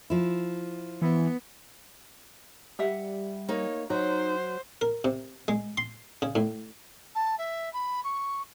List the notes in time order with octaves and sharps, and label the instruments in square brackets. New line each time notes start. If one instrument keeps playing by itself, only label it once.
[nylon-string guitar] F3 E4
[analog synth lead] E3 [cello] B3
[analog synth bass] G3 [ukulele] G4 E5 F#5
[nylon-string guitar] A#3 D#4 [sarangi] C#5
[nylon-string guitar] F#3 [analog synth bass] D#4 [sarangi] C5
[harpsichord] A#4
C3
G#3
C6
C#3
A2
[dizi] A5
E5
B5
C#6